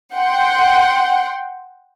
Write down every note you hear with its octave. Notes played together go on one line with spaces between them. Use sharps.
F#5 G5 C6